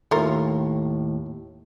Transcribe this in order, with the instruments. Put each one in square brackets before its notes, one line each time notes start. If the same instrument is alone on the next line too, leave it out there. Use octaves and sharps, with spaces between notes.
[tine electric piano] D#2 A2 [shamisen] A3 F4 A#4